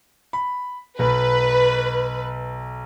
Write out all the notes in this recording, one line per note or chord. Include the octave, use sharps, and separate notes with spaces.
B5
B1 B4